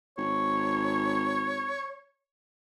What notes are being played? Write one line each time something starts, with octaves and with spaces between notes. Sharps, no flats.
G#1 C#5